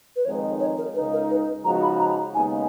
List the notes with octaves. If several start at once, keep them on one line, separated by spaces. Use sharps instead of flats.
B4
F2 D#3 G#3 D#4 C#5
C#5
A#4
C#2 C#3 G#3 D#4 B4
A#4
B4
C#3 F3 G#3 D#4 F#4 A#5
B5
A#5
D#2 C#3 G#3 B3 D#4 G#5